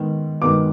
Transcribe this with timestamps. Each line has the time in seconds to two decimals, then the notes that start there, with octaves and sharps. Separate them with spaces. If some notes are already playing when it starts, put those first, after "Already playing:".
Already playing: G#2 D#3 B3
0.41 G#2 D#3 B3 D6